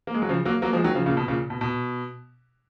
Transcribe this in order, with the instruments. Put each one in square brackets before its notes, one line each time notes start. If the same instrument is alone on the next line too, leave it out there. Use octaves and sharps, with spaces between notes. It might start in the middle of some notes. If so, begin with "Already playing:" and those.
[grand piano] A#3
G#3
F#3
C#3 F3
F#3 A#3
F#3 A#3
F3 G#3
D#3 F#3
C#3 F3
A#2 C#3
B2
A#2 C#3
B2
B2